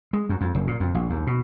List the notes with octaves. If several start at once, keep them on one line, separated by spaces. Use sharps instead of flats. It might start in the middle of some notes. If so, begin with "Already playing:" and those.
G#3
F#2
F2
F#1
A#2
F2
A#1
D#2
B2